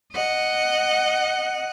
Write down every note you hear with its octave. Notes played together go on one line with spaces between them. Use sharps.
D#5 F#5